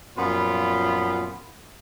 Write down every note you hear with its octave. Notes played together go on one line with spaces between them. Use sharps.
F#2 A#2 F3 B3 F4 B5